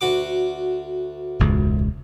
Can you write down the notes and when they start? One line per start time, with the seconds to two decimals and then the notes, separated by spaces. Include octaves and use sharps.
0.01 D2 F#4 D6
1.39 E1 C#2 G#2